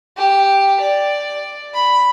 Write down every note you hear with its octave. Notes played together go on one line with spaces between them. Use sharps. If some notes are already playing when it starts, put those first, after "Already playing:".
G4
D5
B5